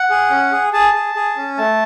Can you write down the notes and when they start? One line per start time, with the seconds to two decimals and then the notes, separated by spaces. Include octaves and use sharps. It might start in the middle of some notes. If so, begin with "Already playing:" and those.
Already playing: F#5
0.10 G#4
0.30 C#4
0.52 G#4
0.73 G#4 A5
0.94 G#4
1.15 G#4
1.36 C#4
1.58 A3 A5